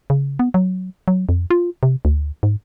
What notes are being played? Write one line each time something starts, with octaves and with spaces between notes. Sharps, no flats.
C#3
B3
F#3
F#3
F2
F4
C3
D2
G#2